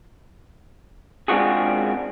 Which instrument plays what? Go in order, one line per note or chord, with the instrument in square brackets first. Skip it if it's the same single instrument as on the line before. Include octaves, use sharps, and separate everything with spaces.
[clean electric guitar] G#3 C4 D4 F4 F#4 G#4